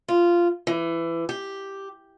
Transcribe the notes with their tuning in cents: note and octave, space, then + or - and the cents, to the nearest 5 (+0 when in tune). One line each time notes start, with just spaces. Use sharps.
F4 -10
E3 +20
G4 +0